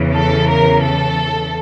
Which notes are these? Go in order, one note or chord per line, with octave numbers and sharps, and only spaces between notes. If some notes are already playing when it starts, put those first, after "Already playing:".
Already playing: E2 C#3 E3
A4
A#4
A4